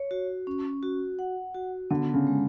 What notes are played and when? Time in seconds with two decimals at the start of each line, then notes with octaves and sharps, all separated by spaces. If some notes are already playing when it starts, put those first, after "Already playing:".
Already playing: C#5
0.11 F#4
0.47 C#4
0.83 F#4
1.19 F#5
1.54 F#4
1.90 D3 B3
2.14 C#3
2.27 G#3